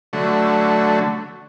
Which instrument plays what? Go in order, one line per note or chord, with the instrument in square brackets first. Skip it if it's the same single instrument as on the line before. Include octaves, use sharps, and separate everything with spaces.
[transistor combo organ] D3 F#3 A3